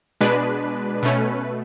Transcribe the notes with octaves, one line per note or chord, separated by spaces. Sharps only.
B2 G#3 D4 B4
B2 A3 C#4